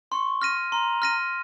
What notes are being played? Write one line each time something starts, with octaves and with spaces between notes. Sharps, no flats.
C6 C#6
F6 A#6 D#7
A#5 C6
F6 A#6 D#7